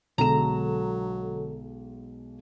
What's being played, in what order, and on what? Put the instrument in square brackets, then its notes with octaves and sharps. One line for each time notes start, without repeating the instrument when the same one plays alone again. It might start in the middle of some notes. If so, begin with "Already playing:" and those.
[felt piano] B1 G#3 E7 [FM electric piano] D3 A4 [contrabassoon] F#3 [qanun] A#5